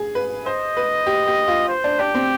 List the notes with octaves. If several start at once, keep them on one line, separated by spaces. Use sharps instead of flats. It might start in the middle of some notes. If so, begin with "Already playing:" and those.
Already playing: G#4
B4
C5 D#5
B4
G4
G4
F4
C5
D4
D4 G4
C4